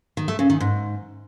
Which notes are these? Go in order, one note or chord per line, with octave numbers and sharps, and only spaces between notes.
D#3
A3
C#3
D#3
G#2